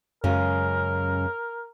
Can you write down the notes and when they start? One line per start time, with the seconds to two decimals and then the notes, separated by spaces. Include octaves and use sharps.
0.24 F#2 C#3 G#3 A#4